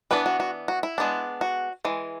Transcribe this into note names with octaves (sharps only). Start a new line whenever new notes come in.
E3 B3 D4 B4
F#4
F#4
F#4
E4
G#3 B3 D4
F#4
E3 G#3